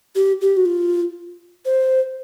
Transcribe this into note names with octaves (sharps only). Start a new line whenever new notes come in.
G4
G4
F#4
F4
C5